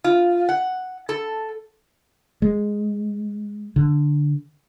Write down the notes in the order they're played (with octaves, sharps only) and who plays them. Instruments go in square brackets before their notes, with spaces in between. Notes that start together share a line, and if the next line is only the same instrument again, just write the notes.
[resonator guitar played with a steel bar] F4
F#5
A4
[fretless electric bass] G#3
D3